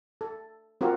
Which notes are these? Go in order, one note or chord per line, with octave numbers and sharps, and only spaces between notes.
A4
C4 F4 F#4 A#4